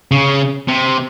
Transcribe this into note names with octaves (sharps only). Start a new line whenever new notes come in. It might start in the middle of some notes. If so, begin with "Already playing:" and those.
C#3
C3